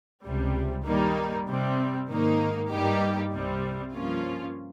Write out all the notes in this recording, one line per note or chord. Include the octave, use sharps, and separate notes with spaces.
C#2 C3 G3
G2 D#3 G3 A#3 D#4
C3 G3 C4
G#2 D#3 A#3 D#4
G2 G3 A#3 D#4 G4
C2 C3 G3 C4
G2 F3 A#3 C#4 F4